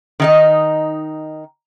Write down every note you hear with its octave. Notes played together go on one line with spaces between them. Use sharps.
D#3 D#4 D#5